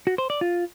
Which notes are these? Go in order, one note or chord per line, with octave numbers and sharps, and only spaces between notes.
F#4
C5
D5
F4